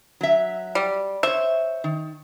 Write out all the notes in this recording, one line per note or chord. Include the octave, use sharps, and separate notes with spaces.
F#3 E5
G3
C5 C#5 E5
D#3